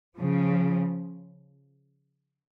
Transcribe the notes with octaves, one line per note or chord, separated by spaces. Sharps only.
C#3 F3